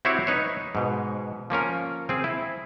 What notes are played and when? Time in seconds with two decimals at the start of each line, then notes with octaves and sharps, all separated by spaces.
0.05 C4 E4 F#4 G4 C5 C#5
0.27 D#4 B4 C#5
0.75 G#2 B2
1.50 F3 A#3 C#4 A#4
2.09 C4 G#4
2.24 E4